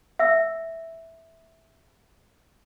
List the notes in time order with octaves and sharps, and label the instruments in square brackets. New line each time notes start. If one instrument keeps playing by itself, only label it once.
[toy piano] E5 E6